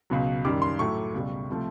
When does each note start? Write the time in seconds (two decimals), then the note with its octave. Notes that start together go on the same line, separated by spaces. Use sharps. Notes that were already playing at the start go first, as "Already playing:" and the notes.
0.10 C#2 B2 F#3
0.45 F#2 D#3 G3 D6
0.62 C6
0.79 A2 F#3 A3 C#6
1.14 C#2 B2 G3
1.50 C3 F3 A3